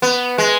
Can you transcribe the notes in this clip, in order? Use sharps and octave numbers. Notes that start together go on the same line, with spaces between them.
B3
G#3